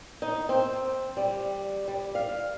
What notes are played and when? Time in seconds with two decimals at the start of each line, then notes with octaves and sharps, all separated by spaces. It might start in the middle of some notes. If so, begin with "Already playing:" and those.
0.22 D#4
0.49 C4
1.17 G3
1.88 G3
2.15 F5